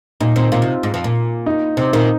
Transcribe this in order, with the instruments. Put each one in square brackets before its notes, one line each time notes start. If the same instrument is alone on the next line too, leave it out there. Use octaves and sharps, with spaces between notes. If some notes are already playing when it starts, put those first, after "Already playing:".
[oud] A#2 [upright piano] D#4
[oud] A#2 D#3 [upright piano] C4
[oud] A#2 D#3 [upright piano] F4
[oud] C3
G#2
F2
A#2
[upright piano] D#4
[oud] C3 [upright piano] C4
[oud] A#2 D#3 [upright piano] D#4